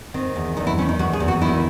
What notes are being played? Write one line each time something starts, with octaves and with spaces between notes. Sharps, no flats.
D#3 C4
E2
E2 D#4
E4
D#3 C#4
D#4
E2 F#4
G#4
E2
F#4
D#3 E4